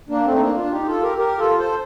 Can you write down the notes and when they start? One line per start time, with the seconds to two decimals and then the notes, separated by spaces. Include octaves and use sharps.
0.09 A#3 D4
0.25 A3 C4
0.35 D#4
0.40 A#3 D4
0.56 D4 F4
0.71 D#4 G4
0.86 F4 A4
1.02 G4 A#4
1.18 G4 A#4
1.38 F4 A4
1.58 A4 C5